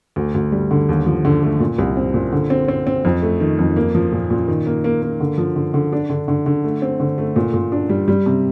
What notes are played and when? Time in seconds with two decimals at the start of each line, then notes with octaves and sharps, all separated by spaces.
0.16 D2
0.34 D2
0.52 G3
0.71 D3
0.89 D#2
1.06 F3
1.25 D3
1.43 A3
1.60 A#2
1.78 C2
1.97 C4
2.14 A#2
2.32 D3
2.50 C4
2.68 C4
2.87 C4
3.05 F2
3.22 A3
3.40 D#3
3.59 F2
3.76 A#3
3.95 F3
4.12 A#2
4.30 A#2
4.48 D#3
4.67 A#3
4.84 A#3
5.02 A#3
5.20 D3
5.38 F3
5.56 D3
5.74 D3
5.93 D4
6.10 D3
6.28 D3
6.46 D3
6.64 A3
6.82 C4
7.00 D3
7.18 A3
7.36 A#2
7.54 A#2
7.72 D4
7.89 G3
8.08 G3
8.26 C3